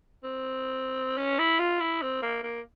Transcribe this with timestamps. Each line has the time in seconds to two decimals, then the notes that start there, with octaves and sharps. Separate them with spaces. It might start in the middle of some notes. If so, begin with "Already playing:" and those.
0.23 C4
1.18 C#4
1.39 E4
1.59 F4
1.80 E4
2.02 C4
2.22 A#3
2.43 A#3